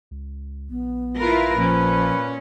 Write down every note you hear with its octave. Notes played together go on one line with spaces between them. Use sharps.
C#2
A#1 B3
E4 F4 A#4 B4
A#2 F3 C#4